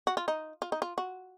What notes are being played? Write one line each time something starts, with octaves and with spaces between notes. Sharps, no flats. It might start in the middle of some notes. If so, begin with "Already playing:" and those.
F#4
F4
D#4
F4
D#4
F4
F#4